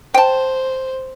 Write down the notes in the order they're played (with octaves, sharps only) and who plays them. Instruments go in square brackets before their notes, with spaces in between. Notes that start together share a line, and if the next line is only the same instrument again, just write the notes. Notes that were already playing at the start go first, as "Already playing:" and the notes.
[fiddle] C5 [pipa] G5 A5